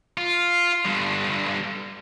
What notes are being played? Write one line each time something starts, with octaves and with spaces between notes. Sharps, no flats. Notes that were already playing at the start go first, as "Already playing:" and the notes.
F4
G2 D3